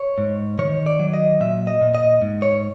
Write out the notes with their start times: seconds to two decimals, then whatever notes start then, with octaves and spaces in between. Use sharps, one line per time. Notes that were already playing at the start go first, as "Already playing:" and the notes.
Already playing: C#5
0.18 G#2
0.59 D#3 C#5
0.86 D5
0.99 F#3
1.13 D#5
1.40 A#2 E5
1.67 D#5
1.81 A#2
1.95 D#5
2.21 G#2
2.42 C#5